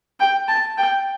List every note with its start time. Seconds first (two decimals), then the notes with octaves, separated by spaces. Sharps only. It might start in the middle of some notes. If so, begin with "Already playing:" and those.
0.20 G5
0.48 A5
0.77 G5